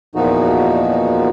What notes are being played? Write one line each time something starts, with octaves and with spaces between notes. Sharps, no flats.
E2 A#2 F3 D#4 F#4